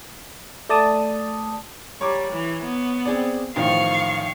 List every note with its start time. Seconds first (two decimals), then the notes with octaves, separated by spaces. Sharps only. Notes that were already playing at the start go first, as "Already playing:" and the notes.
0.69 A3 D5 A5 D#6
2.01 G3 C#5 A#5 D6
2.32 E3
2.64 B3
3.06 C4 G#4 D5
3.56 A1 D#3 F3 F5 C#6